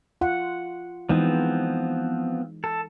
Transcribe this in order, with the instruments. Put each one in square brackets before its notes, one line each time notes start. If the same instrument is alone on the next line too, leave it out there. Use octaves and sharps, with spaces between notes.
[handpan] F4 F#5
[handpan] E3 G#3 D#4 [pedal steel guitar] F3 B3 C4
[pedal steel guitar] A4